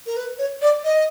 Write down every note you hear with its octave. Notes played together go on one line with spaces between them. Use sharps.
A#4
B4
C#5
D5
D#5